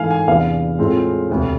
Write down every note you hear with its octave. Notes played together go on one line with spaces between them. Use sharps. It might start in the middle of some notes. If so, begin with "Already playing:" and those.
Already playing: G#2 E3 A3 F5 G#5
G#5
E2 C3 E3 B3 D4 F5
A2 G#3 C4 F4
E1 D2 C3